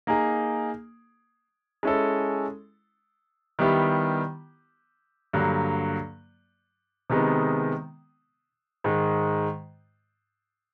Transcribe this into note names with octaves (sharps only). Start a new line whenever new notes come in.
A#3 D#4 G#4
G#3 C#4 E4 A4
D#3 G3 B3 E4 G4
G2 D3 F#3 A#3
C3 D#3 G#3 B3 D#4
G#2 D#3 G#3